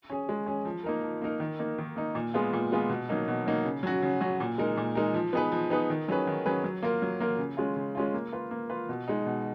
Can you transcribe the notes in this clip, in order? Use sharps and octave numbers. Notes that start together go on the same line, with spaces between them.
C#4 G#4
G#3
C#4 G#4
F3
A#3 D#4 A#4
F3
A#3 D#4 A#4
D#3
A#3 D#4
D#3
A#3 D#4
A#2
G#3 B3 F4 G#4
A#2
G#3 B3 F4 G#4
B2
F#3 A#3 D#4
B2
F#3 A#3 D#4
C#3
F#3 C#4 F#4
C#3
F#3 C#4 F#4
A#2
G#3 D#4 A#4
A#2
G#3 D#4 A#4
F3
B3 D#4 G#4 B4
F3
B3 D#4 G#4 B4
D#3
F#3 C#4 G#4 B4
D#3
F#3 C#4 G#4 B4
F#3
A#3 F4 A#4
F#3
A#3 F4 A#4
C#3
G#3 C#4 F4
C#3
G#3 C#4 F4
A#3
F4 B4
A#3
F4 B4
B2
G#3 D#4
B2